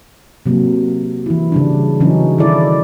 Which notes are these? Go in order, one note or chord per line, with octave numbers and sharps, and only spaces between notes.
C3 F#3 A#3
E3 E4
C#3 G3 D4
C#3 E3 F#3 C#4 D#4
D#3 F#3 E4 A4 D5